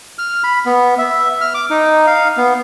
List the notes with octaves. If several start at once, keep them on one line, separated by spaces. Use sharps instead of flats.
F6
B5
B3
E5
F6
D6
D#4
F5
B3